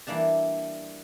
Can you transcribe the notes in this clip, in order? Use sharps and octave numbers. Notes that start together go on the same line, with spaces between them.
E3 G3 A#3 D4 A5